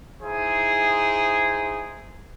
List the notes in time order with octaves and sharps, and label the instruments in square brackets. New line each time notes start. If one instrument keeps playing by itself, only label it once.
[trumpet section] D#4 E4 G#4 C5